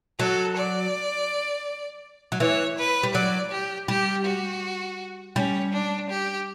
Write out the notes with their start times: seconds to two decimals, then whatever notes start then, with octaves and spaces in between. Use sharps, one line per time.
0.19 F#3 A4
0.56 D5
2.32 F#3
2.40 E3 C#5
2.78 B4
3.03 G3
3.14 F#3 D5
3.51 G4
3.88 G3 G4
4.25 F#4
5.36 G3 C#4
5.73 D4
6.10 G4